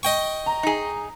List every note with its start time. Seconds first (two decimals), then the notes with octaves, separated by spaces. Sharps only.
0.03 D#5 G5 C#6
0.46 A#5
0.63 D#4 G#4